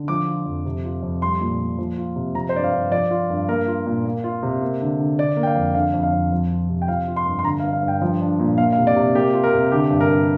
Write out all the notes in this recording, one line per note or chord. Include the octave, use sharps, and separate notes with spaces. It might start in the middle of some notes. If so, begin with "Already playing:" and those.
Already playing: D3
F3 D6
F4
F2
C3
F4
F2
G3 C6
A#2
A#2
F3
F4
C3
F3 A#5
C5
G2 D5
F5
G2
F3 D5
F4
G2
A#3 A#4
F4
A#2
A#3
F4
C3
A#3
D3
D3
D3 D5
A#3
G5
F5
F2
D3 F5
F2
F5
F2
F3
F4
C3
G5
F3 F5
F4
C6
G2
C6
D3 A#5
F5
G2
F5
G2
G5
F3
D4
A#2
A#3 F5
F5
C3
D5
C3
A#3 G4
F4
A#4
C3
D3 G4
G2
A#4
G2